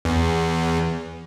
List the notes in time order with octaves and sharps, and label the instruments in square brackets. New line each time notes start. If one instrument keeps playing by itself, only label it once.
[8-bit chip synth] E2